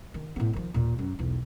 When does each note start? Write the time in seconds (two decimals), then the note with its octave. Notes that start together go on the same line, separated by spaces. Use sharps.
0.14 D#3
0.36 A2 B3
0.53 D#3 F3
0.74 D#2 A#2
0.98 F#2
1.19 B1 E2